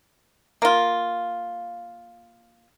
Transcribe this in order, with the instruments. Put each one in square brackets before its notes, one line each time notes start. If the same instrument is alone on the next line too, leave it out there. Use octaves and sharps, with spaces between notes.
[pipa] A#3 F4